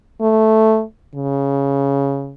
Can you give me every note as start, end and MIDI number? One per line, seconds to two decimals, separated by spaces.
0.21 0.83 57
1.15 2.35 49